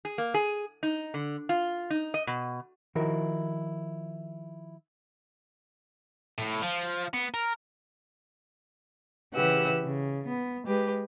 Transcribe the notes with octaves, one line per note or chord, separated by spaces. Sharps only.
G#4
A#3
G#4
D#4
D3
F4
D#4
D#5
B2
D#3 F3 E4 F#4 A#4
A2
F3
B3
A#4
C#3 E3 G4 B4 F#5 E6
C#3
B3
G#3 G4 B4